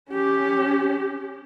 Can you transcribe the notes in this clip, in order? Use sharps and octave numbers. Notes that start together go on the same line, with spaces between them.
C#4 G4